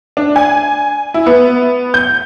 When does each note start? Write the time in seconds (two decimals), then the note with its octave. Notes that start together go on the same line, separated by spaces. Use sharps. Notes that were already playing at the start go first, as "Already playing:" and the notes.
0.17 D4
0.36 G#5
1.14 E4
1.26 B3
1.94 G6